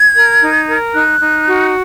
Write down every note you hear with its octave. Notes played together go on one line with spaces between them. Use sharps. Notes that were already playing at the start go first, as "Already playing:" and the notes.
Already playing: G#6
A#4
D#4
A#4
D#4 F#6
D#4
F#4